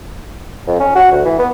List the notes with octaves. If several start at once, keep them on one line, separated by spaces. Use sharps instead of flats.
F2
C#4
F#4
D2
E3
B3